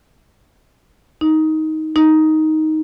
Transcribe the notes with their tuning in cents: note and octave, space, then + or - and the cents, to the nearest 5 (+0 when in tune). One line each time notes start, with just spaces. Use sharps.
D#4 +10
D#4 +5